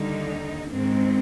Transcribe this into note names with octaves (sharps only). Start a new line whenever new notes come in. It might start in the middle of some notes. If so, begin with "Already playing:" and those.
Already playing: D#2 D3 G3 D#4
G#2 D#3 G#3 C4